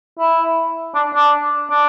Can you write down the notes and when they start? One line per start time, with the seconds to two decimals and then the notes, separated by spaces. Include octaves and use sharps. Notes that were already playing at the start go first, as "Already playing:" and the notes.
0.19 E4
0.95 D4
1.15 D4
1.70 D4